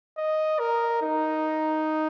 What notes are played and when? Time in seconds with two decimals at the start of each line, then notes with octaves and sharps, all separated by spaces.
0.18 D#5
0.59 A#4
1.02 D#4